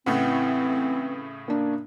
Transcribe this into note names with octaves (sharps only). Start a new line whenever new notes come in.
A2 C#3 E3 A3 C4 F#5
A#3 D4